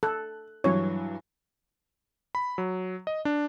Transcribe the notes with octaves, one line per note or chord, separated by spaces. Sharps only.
A4 F#6
G2 E3 F#3 C#5
B5
F#3
D#5
D4